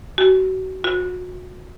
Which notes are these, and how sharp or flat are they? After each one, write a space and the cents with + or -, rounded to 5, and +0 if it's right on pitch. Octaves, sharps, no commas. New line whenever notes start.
F#4 +30
F#4 -30